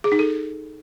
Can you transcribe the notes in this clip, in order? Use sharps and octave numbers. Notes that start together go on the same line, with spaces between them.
G#4
D#4
A4